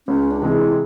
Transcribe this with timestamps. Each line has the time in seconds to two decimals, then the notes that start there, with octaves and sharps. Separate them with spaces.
0.07 C#2 C#4
0.31 D4
0.41 C3 E3 G#3 C4
0.52 E4